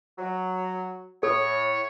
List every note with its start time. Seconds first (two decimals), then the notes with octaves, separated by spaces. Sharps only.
0.19 F#3
1.23 A2 A4 C#5